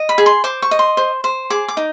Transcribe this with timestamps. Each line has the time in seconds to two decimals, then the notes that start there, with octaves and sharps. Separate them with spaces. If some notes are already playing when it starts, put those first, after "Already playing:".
Already playing: D#5
0.09 B5
0.18 G#4
0.26 C6
0.44 C5 D6
0.62 C#6
0.71 D#5
0.79 C6
0.97 C5
1.24 C5
1.50 G#4 D6
1.68 D6
1.77 D#4